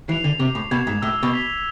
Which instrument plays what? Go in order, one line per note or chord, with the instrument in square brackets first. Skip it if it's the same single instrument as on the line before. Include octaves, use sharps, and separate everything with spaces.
[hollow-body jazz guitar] E3 [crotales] C7
[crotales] F7
[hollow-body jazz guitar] D3
[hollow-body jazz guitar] C3 [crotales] D6
[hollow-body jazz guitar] A2
[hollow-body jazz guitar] B2 [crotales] G#6 C7 E7
[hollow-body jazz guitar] G#2
[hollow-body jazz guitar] A2 [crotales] E6
[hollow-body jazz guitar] B2
[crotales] B6 F7